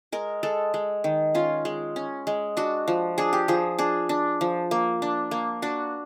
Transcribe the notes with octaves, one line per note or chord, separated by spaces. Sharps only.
G#3 A#4
G#3 A4
G#3
D#3
C#4 F4
G#3
C#4
G#3
D4 F#4
F3
D4 G#4
G4
F3 G#4
D4 G#4
D4
F3
A#3
D4
A#3
D4 F#4